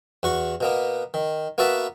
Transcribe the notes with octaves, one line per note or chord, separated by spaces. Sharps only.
E2 F#4 C#6
B2 A#3 B3
D#3
A#3 B3 F#4 B4 E5 A5